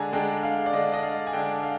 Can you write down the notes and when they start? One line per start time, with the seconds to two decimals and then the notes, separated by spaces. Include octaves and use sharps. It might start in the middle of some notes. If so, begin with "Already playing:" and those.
Already playing: D3 G#3 D4 G#5 A#5
0.12 D3 G#3 D4 G5
0.43 F5
0.66 D5
0.73 D3 G#3 D4 D#5
0.94 D#5
1.03 F5
1.27 G#5
1.33 D3 G#3 D4 G5
1.63 F5